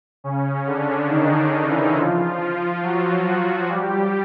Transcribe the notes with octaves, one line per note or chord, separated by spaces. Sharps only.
C#3 C#4
D3 D4
D#3 D#4
D#3 D#4
E3 E4
F3 F4
F3 F4
F#3 F#4
F#3 F#4
G3 G4